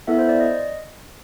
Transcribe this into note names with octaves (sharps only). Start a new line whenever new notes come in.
B3 E4 A4 E5
C5
D5
D#5